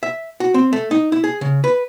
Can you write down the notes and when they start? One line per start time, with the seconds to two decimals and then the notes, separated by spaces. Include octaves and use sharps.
0.03 E5
0.40 F#4
0.54 C4
0.73 A3
0.91 D#4
1.12 E4
1.24 G#4
1.41 C#3
1.64 B4